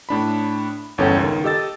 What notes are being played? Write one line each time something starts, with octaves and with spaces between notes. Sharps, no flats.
A2 D4 B5
G1 E2 C#4 A4 C#5 G5
C#2 D#3
G4 A4 D#5 E6 A6